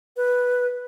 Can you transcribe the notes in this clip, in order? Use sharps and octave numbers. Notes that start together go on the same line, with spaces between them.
B4